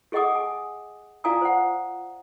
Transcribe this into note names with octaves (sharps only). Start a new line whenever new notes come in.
G4 G#4 D#5 F#5 D6 D#6
G#5
F4 D5 F5 G#5 A#5 D#6
C5 F#5